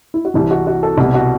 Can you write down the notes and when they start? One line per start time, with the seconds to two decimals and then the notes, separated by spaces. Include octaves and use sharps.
0.14 E4
0.25 F#4
0.34 C2 C3 E3 G4
0.51 F#4
0.67 F#4
0.83 A4
0.98 C2 B2 G4
1.14 F#4